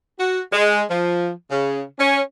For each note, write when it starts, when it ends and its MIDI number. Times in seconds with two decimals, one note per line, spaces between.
0.18 0.40 66
0.52 0.82 56
0.89 1.29 53
1.50 1.82 49
1.99 2.20 61